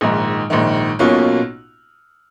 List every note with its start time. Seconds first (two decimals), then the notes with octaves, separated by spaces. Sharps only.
0.01 A#1 G#2 D#3
0.50 A#1 G#2 D#3
0.99 B1 B2 A#3 C#4 F4